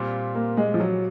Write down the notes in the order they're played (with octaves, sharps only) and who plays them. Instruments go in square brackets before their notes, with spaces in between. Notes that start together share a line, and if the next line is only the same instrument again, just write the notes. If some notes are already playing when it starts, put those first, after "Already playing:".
Already playing: [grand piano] A#2 G3 C4 F4
[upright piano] A#3
G#3
F3
F#3